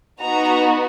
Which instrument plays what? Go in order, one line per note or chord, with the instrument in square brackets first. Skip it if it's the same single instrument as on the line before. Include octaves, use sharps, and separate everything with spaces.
[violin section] B3 D#4 F#4 A#5